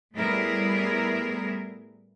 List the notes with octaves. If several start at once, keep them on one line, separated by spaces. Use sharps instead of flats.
A2 G3 B3 E4 G#4 A#4